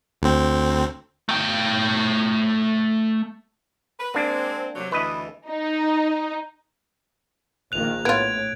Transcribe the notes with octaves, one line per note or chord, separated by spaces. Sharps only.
D2 C4
A3 G5
B4
G#3 A#3 C4 D4
C3 F#3
D2 E3 E4 B4 D#5
D#4
A#1 D#3 A#3 F#6 F7
A2 B3 F4 G#6 D7